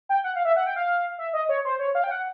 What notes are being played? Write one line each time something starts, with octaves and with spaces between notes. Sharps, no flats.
G5
F#5
F5
E5
F#5
G5
F5
E5
D#5
C#5
C5
C#5
F5
G5
F#5